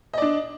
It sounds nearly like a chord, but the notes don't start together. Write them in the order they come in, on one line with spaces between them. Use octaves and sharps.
D#5 D5 D4